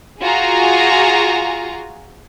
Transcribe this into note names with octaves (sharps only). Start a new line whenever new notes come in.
F4 F#4 G#4 G#5 A#5